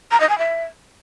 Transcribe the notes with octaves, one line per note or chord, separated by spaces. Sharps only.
A#5
D#5
G#5
E5